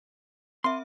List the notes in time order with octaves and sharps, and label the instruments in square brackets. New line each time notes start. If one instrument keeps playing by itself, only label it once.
[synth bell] C4 E5 [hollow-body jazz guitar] C6